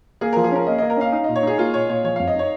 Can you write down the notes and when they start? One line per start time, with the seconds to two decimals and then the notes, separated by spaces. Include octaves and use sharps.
0.21 A#3 G#4
0.33 F3 A#4
0.44 G#4
0.52 C#4 A#4
0.67 A#3 D#5
0.78 A#3 D#5
0.90 A#4
0.97 C#4 F5
1.12 D#4 F5
1.24 A#2 D#5
1.36 C#5
1.43 D#4 G#4
1.58 A#3 F4
1.74 A#2 C#5
1.89 A#2 C#5
2.04 F3 C#5
2.16 F2 F5
2.27 D#5
2.36 D#4 C#5